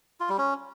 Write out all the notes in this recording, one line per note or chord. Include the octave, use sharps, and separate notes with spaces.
F4
G3
C#4